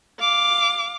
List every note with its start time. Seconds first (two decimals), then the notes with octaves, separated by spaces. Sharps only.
0.20 F5 D6